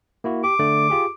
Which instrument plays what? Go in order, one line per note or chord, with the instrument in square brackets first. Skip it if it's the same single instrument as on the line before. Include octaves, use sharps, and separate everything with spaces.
[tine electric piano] A#3 E4 F#4
[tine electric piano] G4 [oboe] D6
[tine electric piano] D3 A3 D5
F4 G4 G#4